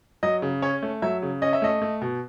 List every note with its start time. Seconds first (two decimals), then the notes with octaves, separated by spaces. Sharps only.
0.23 F#3 D#5
0.42 C#3
0.62 C#4 C#5
0.83 A3
1.02 F#3 E5
1.22 C#3
1.42 C#4 D#5
1.53 E5
1.62 A3 D#5
1.82 A3
2.01 B2